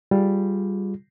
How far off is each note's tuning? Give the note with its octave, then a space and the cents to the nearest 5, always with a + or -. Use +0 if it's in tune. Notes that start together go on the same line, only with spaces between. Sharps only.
G3 +0 F4 +20 G#4 +10